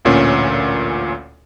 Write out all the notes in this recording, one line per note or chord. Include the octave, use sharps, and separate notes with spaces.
A1 D2 A#2 C#4